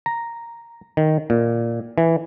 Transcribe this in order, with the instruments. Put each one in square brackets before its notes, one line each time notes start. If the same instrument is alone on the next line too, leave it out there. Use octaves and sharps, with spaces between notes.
[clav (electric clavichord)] A#5
D#3
A#2
E3